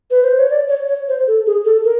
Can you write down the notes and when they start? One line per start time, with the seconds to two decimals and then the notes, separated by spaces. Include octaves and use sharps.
0.11 B4
0.24 C5
0.37 C#5
0.50 D5
0.69 C#5
0.88 C#5
1.08 C5
1.27 A4
1.46 G#4
1.65 A4
1.84 A#4